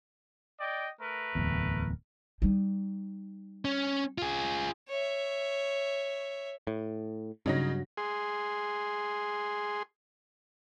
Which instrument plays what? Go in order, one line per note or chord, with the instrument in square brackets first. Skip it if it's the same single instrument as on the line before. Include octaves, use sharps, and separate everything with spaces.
[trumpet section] D5 D#5 G5
A3 A#4 B4
[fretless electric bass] D1 G1 E2
[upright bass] G3 D#4
[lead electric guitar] C#4
F4 G#4
[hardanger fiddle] C#5 E5
[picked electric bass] A2
[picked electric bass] G2 F#3 [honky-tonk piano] C#3 D#4 A#6
[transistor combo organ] G#4 C6